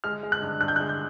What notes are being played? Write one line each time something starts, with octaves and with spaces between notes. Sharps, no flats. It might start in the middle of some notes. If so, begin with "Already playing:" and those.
G#3 F6
G#3
F#6
G2
G2 F#6
G6
F#6
G#3
G6